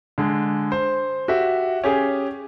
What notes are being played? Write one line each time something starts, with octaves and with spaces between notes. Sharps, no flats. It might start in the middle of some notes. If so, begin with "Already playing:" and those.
D3 G#3
C5
F#4 G4 E5
C#4 G4 G#4